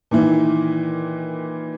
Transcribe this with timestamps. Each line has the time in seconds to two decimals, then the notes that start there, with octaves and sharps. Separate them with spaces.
0.11 A#2 D#3 E3